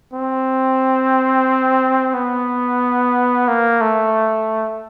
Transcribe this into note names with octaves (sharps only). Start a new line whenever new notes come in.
C4
B3
A#3
A3